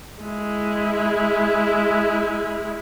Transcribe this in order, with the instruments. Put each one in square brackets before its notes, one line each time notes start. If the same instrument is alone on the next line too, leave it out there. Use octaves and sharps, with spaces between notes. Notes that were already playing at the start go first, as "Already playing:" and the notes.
[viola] G#3 E4